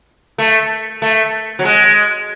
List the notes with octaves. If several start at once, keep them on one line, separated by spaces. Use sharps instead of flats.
A3
A3
F#3
G#3